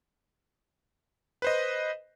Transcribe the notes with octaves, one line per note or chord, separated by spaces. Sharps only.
B4 C5 D#5